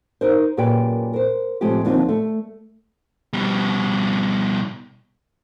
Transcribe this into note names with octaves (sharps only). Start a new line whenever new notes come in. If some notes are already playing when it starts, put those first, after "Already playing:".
D#4 A#4 C5
F#2 A#2 G4 G#4 B4 G5
A#4 C5
A2 C3 F3 G#3 A3 G4
D#2 D3 F3 C4 D#4 F4
A3
B2 G3